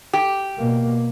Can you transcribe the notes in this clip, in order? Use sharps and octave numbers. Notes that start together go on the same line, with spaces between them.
G4
B2 A#3